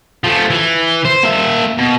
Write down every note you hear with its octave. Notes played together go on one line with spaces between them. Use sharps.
F3 A3
E3
C5
A#3 E5
B2